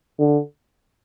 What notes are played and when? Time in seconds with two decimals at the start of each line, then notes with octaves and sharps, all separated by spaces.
0.19 D3